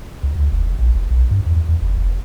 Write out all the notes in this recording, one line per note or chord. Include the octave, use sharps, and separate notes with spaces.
C#2
D2
F1
A#1
F1
B1
G2
E2
E2
F#1
F1